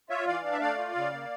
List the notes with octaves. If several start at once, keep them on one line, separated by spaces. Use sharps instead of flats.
F4 C#5 E5
E3 D5 F5
D4
E5
A3 D5 F5
F4
C#3
A#3